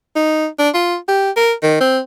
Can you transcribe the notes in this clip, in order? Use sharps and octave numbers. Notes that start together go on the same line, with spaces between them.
D#4
D4
F4
G4
A#4
D#3
C4